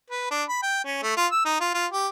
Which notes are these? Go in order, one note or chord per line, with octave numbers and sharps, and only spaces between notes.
B4
D4
B5
G5
C#4
A3
F4
E6
D#4
F4
F4
G4